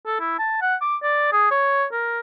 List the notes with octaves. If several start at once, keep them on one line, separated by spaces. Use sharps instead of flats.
A4
E4
A5
F#5
D6
D5
G#4
C#5
A#4